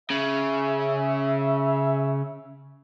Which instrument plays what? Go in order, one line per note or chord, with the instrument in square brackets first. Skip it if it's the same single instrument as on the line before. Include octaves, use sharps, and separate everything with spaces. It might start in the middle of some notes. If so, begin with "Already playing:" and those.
[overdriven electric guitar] C#3 [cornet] E5